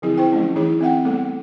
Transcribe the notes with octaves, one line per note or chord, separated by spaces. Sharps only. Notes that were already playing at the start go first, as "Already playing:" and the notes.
D3 F3 F#3 C4 E4 G#4
E4 F4 C5 G5
F3 F#3 A3 C#4
E3 D#4 E4 G#4 C#5
C4 E5 F#5 G5
G3 A3 B3 A4